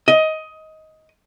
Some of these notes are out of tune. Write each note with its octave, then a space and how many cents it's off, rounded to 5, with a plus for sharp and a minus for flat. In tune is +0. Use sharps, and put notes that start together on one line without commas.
D#5 +15